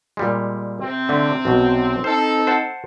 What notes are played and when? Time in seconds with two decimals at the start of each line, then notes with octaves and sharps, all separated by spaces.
0.17 A#2 G3 G#3
0.80 C3 C4
1.09 D3 A3
1.45 B1 B2
2.04 C4 D#4 A4 C5
2.47 C5 F#5 A5